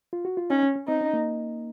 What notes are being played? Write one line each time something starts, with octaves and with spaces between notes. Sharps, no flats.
F4
F#4
F4
C#4 D#4
C#4
C#4
C4 D#4
C#4
A#3